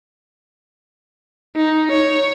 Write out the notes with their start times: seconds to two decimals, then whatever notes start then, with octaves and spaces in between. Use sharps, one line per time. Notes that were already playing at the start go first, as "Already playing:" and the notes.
1.56 D#4
1.91 C#5